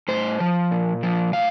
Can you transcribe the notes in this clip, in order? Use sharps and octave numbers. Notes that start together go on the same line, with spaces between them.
A2 C5
F3
A#2
F3
A2 F5